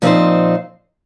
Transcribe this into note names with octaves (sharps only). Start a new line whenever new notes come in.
A#2 F3 C4 D#4 C5